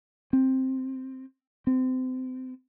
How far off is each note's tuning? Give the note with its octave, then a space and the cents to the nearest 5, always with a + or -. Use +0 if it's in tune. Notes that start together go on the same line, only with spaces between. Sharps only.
C4 +5
C4 -30